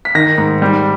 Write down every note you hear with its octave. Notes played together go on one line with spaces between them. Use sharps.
B6
D#3 A#6
G#2
G3